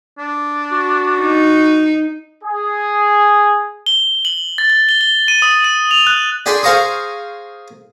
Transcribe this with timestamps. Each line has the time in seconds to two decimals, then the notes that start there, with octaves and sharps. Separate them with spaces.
0.19 D4
0.72 F#4
1.20 D#4
2.44 G#4
3.86 G7
4.25 F#7
4.58 A6
4.70 A6
4.89 G7
5.01 G7
5.28 D#7
5.42 D#6
5.64 D#7
5.91 F7
6.07 F#6
6.46 D4 G#4 G5 G#5 B5 C6
6.63 G#4 C5 F5 A#5 C#6 D#6